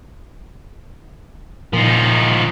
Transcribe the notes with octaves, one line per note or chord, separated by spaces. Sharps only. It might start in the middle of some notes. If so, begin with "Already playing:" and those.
A#2 F3 D#4